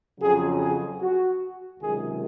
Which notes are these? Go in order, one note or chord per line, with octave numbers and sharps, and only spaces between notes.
F2 C#3 F#3 G#4
G#4
F#4
C#2 C3 D#3 F#3 G#4